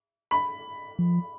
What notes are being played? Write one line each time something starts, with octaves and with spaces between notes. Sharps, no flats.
B5
F3